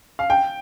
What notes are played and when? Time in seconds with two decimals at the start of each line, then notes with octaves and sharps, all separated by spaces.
0.19 F5
0.30 G5